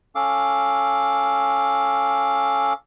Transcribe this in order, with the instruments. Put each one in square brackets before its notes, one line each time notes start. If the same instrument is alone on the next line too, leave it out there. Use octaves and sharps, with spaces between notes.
[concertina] C#4 A4 F5 D6